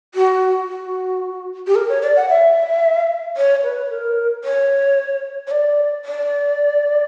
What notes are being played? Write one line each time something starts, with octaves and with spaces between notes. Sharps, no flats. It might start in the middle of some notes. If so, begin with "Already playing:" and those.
F#4
F#4
G4
A#4
C#5
D5
F#5
E5
C#5
B4
A#4
C#5
C#5
D5
D5